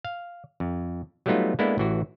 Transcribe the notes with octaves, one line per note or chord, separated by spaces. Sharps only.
F5
F2
F#3 G3 A3 B3 D#4 F4
G#3 A#3 B3 D4 E4 A4
A1 E3 F#4